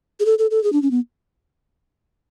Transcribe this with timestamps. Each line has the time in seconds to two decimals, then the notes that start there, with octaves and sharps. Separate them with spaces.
0.20 G#4
0.26 A4
0.39 A4
0.51 A4
0.63 G#4
0.73 D4
0.82 C#4
0.91 B3